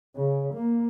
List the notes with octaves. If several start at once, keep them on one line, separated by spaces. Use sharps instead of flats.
C#3
A#3